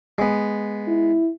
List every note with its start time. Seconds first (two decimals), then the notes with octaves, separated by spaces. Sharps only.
0.18 G#3 B3
0.88 E4